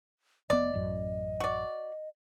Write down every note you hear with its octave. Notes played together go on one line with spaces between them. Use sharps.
F1 B3 D5 D#5
A1 F#2
F#4 D5